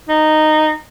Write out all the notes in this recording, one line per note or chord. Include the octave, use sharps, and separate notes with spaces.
D#4